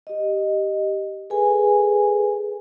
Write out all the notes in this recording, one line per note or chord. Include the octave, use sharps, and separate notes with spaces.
G4 D#5
G#4 A4 B4 G#5